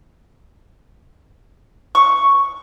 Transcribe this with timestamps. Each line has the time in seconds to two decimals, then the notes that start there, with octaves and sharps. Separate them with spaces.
1.95 C#6